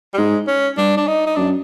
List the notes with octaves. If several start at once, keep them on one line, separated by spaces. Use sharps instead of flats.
G3
G#2 G#3
C#4
G2 D4
D4
D#4
D#4
F#2 D4